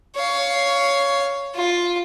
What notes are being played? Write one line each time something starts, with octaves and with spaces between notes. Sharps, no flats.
C#5 F5
F4